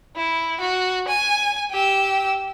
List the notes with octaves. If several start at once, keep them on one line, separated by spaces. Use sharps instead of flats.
E4
F#4
G#5
G4 E6